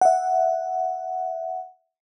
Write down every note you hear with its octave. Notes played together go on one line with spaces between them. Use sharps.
E5 F#5